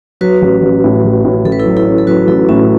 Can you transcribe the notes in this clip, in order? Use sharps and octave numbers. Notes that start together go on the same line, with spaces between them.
F#3 F#4 B4
A1
A1
A2
A1
A2
A1 A4
B4
E4 A4
F#3
E4 A4
C#4
A4
F#3 F#4 B4
A1 E4 A4
A2 C#4 F#4